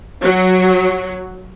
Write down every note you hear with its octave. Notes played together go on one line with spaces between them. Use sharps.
F#3